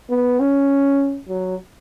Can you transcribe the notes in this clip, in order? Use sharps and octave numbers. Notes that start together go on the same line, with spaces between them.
B3
C#4
F#3